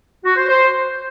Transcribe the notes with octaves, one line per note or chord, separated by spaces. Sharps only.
F#4
C5
C5